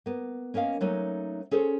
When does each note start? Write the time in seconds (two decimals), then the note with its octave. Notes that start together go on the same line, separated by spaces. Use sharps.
0.06 A#3 B3
0.54 A#3 C#4 A#4 D#5 F5
0.81 F#3 A3 A#3 C#4 D#4
1.51 C#4 G#4 A4 C5